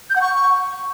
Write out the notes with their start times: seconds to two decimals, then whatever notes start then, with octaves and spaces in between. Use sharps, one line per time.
0.10 G6
0.16 F#5
0.21 C#6